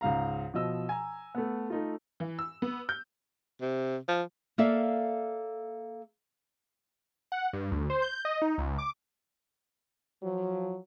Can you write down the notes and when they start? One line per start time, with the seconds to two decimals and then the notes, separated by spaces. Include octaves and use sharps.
0.01 C#2 G#2 F5 A#5
0.54 B2 F3 D#5 E6
0.89 G#5 A#5
1.35 A3 B3
1.70 A3 D#4 F4
2.20 E3
2.39 E6
2.62 B3
2.89 G6
3.61 C3
4.08 F3
4.58 A#3 A4 D5 E5 F5
7.32 F#5
7.53 G2
7.72 D2
7.90 C5
8.02 G6
8.25 D#5
8.42 D#4
8.58 C#2
8.78 D6
10.23 F3 F#3